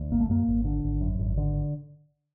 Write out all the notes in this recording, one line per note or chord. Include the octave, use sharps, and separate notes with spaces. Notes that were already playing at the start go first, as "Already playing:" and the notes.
Already playing: D2
G#1 A#3
A3
F#2 A#3
G#1
D3
G#1
F#2
G#1
D3